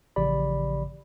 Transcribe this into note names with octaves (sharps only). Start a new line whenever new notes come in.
A1 C#3 F3 G4 D5 B5